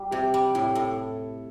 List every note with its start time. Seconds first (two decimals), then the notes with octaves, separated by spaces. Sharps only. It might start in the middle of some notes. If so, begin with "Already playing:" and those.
Already playing: G3
0.11 C3 G4
0.34 G3
0.55 A2 E4
0.75 A2 A4